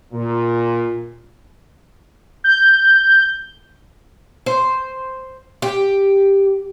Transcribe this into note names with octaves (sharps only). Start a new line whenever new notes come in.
A#2
G6
C5
G4